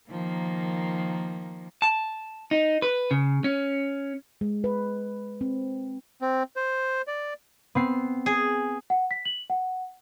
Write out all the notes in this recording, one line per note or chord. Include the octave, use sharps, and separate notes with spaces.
D#3 F3 A#3
A5
D#4
B4
C#3
C#4
G#3
B4
C4
C4
C5
D5
B3 C4 C7
G#4
F#5
B6
F#7
F#5